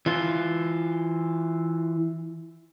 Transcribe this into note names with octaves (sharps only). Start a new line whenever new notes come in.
E3 F4